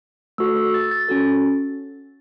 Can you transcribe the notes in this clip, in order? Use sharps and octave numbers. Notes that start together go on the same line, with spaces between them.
A3 F#4 A4 E6
E6
A6
A6
C#4 F#4 A4